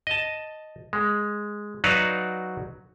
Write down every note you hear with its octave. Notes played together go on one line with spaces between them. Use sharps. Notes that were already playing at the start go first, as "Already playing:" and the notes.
D#5 A5
G#3
F#3 D#4 F#4 B4 D5 F5